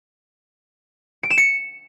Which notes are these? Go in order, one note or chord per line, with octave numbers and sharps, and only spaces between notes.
D7
E7
C#7